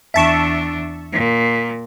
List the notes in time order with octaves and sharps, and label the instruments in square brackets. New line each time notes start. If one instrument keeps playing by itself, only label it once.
[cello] E2 D4 [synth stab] E5 A5 C#6
[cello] A#2